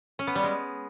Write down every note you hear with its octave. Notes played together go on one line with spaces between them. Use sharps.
C#4
B3
G3
G#3